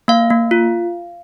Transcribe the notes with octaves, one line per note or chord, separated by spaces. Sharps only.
A#3 F5
A#3
F4